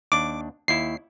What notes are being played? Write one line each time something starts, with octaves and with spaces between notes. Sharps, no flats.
D#2 D4 D6
D#2 E4 C7